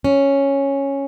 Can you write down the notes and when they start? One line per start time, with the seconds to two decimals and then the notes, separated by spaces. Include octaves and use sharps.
0.04 C#4